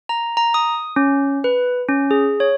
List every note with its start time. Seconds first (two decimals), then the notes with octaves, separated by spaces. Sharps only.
0.09 A#5
0.37 A#5
0.54 D#6
0.96 C#4
1.44 B4
1.89 C#4
2.11 G#4
2.40 C#5